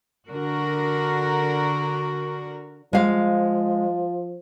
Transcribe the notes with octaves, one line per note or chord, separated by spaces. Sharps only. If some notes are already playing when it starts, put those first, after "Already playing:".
D3 F#4 A#4
F3 G#3 F5